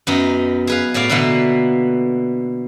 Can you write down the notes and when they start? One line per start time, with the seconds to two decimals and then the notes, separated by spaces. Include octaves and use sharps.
0.07 F#2 B3 D#4
0.67 G#4 B4 F5
0.94 A2 F#4 D5 F5
1.09 B2 D3 E3 A#3 B3